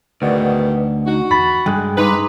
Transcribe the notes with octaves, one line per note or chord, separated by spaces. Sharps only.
D2 G#2 B2 D#3 B4 D5 F#5
D#4 F#4
E2 B5 A6
G2 G#3 G5 F#6
D#4 B4 A#5 C6 D6